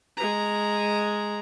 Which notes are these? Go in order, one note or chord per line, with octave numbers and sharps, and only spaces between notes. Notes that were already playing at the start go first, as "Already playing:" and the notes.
G#3 A#5